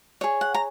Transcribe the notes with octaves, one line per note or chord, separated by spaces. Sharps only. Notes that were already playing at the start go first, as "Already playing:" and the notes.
G#4 C#5
F#5
A#5